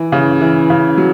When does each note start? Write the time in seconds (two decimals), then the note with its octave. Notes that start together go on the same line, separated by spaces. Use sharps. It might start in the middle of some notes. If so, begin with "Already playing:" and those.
Already playing: E3
0.12 C#3
0.41 E3
0.70 C#3
0.98 F#3